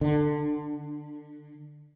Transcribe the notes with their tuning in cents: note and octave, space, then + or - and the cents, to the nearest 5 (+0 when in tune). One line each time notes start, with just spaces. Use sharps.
D3 +20